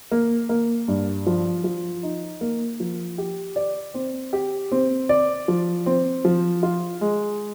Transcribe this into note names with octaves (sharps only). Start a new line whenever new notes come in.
A#3
A#3
G2
F3
F3
D#4
A#3
F3
G4
D5
C4
G4
C4
D5
F3
C4
F3
F4
G#3